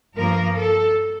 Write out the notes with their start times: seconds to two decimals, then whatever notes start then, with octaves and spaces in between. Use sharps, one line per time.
0.17 G2 F3 A#3 A#4
0.56 A4